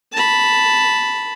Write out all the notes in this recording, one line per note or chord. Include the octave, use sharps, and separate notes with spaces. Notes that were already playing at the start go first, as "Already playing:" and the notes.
A5 B5